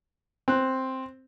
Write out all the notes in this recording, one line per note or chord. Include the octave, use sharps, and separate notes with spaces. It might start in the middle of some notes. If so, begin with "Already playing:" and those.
C4 F#6